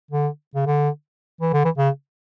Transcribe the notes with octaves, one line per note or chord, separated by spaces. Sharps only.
D3
C#3
D3
E3
D3
E3
C#3